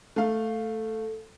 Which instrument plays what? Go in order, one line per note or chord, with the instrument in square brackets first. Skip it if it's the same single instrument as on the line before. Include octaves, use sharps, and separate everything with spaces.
[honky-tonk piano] A3 F5 [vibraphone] A4